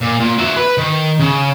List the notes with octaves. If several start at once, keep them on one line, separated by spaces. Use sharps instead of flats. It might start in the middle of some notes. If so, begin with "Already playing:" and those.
A#2
A#2
F#4 E5
B4
D#3
C#3